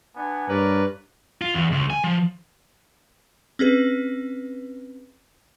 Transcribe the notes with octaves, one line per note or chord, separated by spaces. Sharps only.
B3 D4 G#5
G2 A#4 B4 C#5 D5
F4
E2
C#2
G#5
F3
C4 C#4 G#4 B4